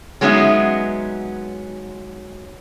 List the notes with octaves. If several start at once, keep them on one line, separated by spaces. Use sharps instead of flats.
F#3 G#3 B3 C#4 D#4 E5